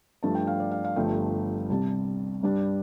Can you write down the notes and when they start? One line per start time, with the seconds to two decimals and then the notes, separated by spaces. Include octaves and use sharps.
0.23 G2 F3 A3 D4 A5
0.35 G5
0.47 F5
0.60 D5
0.71 F5
0.85 F5
0.96 G1 G2 F3 A3 G5
1.69 C2 C3 G3 A5
2.43 G2 G3 D4